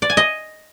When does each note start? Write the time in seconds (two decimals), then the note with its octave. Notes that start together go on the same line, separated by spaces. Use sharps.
0.02 D5
0.10 G#5
0.17 D#5